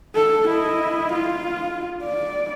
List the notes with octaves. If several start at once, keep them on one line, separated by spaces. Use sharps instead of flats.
A4
E4 D#5
F4
D5